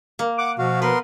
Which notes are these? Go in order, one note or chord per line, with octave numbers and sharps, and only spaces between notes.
A#3
F#5 D6
B2 F3 F#4 F5
B3 A#4 B4 C6